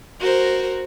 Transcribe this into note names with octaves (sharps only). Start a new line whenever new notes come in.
F#4 A#4 C5